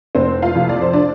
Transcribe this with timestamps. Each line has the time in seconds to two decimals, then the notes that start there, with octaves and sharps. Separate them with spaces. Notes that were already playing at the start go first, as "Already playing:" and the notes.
0.15 F1 C4 C5
0.42 F4 F5
0.55 F2 C3
0.69 D5
0.82 C5
0.93 D4 D5